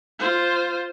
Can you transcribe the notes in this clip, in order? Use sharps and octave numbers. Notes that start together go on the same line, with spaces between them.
F4 C5